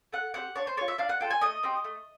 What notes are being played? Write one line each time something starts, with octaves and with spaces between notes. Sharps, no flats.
A3 F#5
C4 D#4 G4 F#5
D4 C#5
C5
F4 A4 C#5
E5
D4 F5
F#5
F4 A4 G5
G#5
A3 D#5
C4 D#4 G4
A3